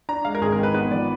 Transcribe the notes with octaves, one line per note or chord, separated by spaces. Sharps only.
D4 A#5
G#3 F5
A#4
G#1 G#4
A#4
D#3
B4
B3 B4
F3 D5